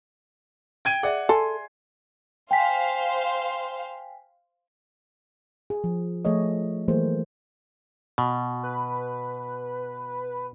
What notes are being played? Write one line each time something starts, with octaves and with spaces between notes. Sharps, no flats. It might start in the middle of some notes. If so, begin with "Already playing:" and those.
G5 G#6 D#7
G#4 D5 E5 F#5
A4 G#5 C6
C5 F5 G5 G#5 C6 B6
G#4
F3
F3 A3 G#4 A4 C#5 D#5
E3 F#3 A3 A#3 G#4 C5
B2
B4